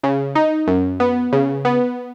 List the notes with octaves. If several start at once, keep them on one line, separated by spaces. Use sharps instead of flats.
C#3
D#4
F#2
B3
C#3
B3